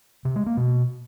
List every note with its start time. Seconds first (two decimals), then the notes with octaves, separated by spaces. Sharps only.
0.25 C3
0.36 G#3
0.46 A#3
0.57 B2